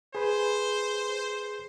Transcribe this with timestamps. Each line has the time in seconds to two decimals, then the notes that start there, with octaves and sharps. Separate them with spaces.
0.15 G#4 B4 C5